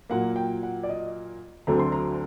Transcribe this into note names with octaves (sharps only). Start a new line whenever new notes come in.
A#2 F#3 A#3 F#5
G5
F#5
D5
D#5
D2 D3 F#3 A3 C4 A#5
C6
A#5